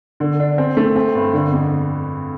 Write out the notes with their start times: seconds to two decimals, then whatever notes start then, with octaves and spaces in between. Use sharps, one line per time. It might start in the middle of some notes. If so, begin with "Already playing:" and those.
0.20 D3
0.40 D4
0.58 C4
0.77 A3
0.96 C4
1.15 G2
1.34 D3
1.52 F2